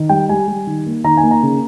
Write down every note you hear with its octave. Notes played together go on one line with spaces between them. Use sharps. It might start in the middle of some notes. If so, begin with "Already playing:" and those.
Already playing: D#3
G3 G5
G3 G#5
G3
D#3
A#3
D#3 A#5
G#5
A#3
A#5
C#3